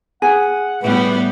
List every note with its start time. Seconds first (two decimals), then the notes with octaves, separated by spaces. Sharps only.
0.22 G#4 F#5
0.82 A2 G3 B3 B4